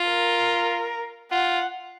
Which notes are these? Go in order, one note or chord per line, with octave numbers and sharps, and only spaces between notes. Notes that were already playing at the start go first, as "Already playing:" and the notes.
Already playing: F4
A#4
F4 F#5